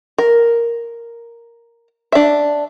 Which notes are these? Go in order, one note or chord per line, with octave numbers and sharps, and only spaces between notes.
A#4
D4 E5